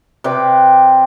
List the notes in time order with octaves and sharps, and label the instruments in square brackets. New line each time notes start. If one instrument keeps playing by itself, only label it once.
[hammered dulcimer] C3 B4 D5 G5